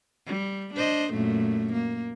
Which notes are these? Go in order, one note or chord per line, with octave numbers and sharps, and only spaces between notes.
G3
D4 C5 D#5
F#2 A#2 A3
A#3